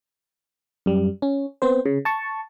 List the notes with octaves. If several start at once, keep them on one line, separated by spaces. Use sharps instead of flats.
F#2 G3
C#4
B3 C4 C5
C#3
A5 C#6